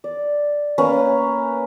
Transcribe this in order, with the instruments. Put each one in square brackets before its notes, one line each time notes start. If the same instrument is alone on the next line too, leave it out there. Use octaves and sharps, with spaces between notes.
[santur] D5
A#3 C#4 A#4 B4